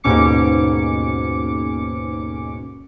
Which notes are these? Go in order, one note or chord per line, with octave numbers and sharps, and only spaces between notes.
D#2 G#2 B2 C#4 D6 C#7